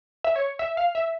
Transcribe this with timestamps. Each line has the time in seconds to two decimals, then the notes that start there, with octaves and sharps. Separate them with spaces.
0.24 E5
0.36 C#5
0.59 E5
0.77 F5
0.95 E5